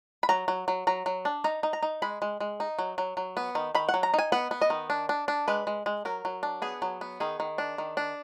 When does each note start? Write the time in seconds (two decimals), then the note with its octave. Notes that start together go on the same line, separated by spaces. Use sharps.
0.23 B5
0.29 F#3 A#5
0.48 F#3
0.68 F#3
0.87 F#3 A#5
1.06 F#3
1.25 D4
1.44 D#4 A#5
1.63 D#4
1.73 A#5
1.83 D#4
2.02 G#3 B5
2.22 G#3
2.41 G#3
2.60 D#4
2.79 F#3
2.98 F#3
3.17 F#3
3.37 B3
3.55 D#3
3.75 D#3 B5
3.89 F#5
3.94 F#3
4.03 A#5
4.14 D#4 G#5
4.32 B3 F#5
4.51 B3
4.62 D#5
4.70 D#3
4.90 D4
5.09 D4
5.28 D4
5.48 G#3 B4
5.67 G#3
5.86 G#3
6.05 F#3 A#4
6.25 F#3
6.43 D4
6.62 B3 G#4
6.82 F#3
7.01 B3
7.20 D#3 G#4
7.40 D#3
7.58 D4
7.78 D#3
7.97 D4